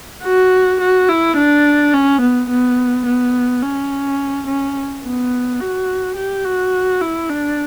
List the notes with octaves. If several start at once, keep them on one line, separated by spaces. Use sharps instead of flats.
F#4
F#4
E4
D4
C#4
B3
B3
B3
C#4
C#4
B3
F#4
G4
F#4
E4
D4